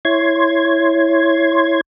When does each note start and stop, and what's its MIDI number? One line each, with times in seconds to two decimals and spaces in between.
0.05 1.81 64
0.05 1.81 73
0.05 1.81 84
0.05 1.81 92